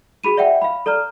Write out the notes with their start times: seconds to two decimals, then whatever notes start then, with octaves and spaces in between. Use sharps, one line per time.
0.24 F#4 G#4 B5 D#7
0.37 D5 E5 F#5 G5
0.62 F5 B5
0.86 A4 D5 A#5 F6